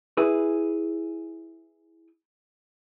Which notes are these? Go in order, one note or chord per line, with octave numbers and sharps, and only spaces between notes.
E4 G#4 B4